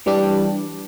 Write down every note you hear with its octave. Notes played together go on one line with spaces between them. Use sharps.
E3 G3 D4 G4